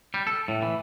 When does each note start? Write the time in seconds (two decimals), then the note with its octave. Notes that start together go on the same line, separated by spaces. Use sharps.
0.14 G3
0.27 A4
0.48 A2
0.62 E3